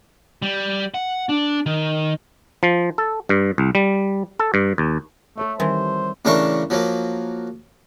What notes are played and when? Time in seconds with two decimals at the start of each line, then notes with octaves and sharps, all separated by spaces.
0.42 G3
0.94 F#5
1.29 D4
1.66 D#3
2.63 F3
2.98 A4
3.29 G2
3.58 C2
3.75 G3
4.39 A4
4.54 G2
4.78 D#2
5.38 A3 A4 C#5 E5
5.60 D#3 E3 G3 C4 C5
6.25 A2 C#3 E3 D4 A#4 C#6
6.70 F3 F#3 A#3